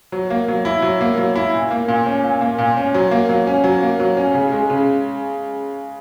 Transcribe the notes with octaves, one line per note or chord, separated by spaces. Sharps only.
F#3
A#3
F#3
E4
F#3
A#3
F#3
E4
A#2
A#3
A#2
C#4
A#2
A#3
A#2
C#4
F#3
A#3
F#3
C#4
F#3
A#3
F#3
C#4
C#3
G#3
C#3